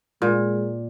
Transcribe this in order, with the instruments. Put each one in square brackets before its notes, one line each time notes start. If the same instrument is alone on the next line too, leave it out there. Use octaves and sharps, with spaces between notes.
[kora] A#2 [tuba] G#3